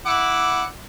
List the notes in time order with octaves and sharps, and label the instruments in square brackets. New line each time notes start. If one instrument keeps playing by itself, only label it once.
[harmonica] E4 F#5 D6